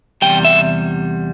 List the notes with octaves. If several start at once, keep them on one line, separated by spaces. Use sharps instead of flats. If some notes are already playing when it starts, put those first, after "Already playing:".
E2 C3 G3 G5
E5